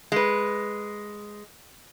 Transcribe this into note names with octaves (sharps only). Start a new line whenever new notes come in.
G#3 B4